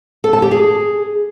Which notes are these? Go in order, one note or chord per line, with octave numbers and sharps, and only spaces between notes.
A4
A5
G4
G#4